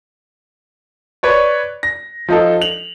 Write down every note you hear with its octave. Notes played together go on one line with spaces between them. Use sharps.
B4 C#5 D5
A#6
F3 D#4 A4
F7 F#7